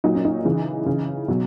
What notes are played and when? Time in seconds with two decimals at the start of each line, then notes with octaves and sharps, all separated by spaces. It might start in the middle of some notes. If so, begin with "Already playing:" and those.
0.04 A#2 F#3 D#4
0.15 C#4
0.25 D#4
0.45 C#3 E3
0.86 C#3 E3
1.28 B2 F#3